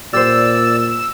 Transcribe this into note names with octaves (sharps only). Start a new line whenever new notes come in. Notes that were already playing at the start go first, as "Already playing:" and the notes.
A#2 G4 C5 D5 E6